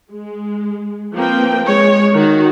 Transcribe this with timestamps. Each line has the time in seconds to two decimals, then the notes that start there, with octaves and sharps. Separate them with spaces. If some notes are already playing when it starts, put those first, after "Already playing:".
0.12 G#3
1.15 F3 A#3 C4 B4 G5
1.64 G#3 C#5
2.13 D#3 F#4